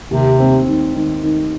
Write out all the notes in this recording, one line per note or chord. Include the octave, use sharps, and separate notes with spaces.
D#2 C3
C4
D#3
D#3
D#3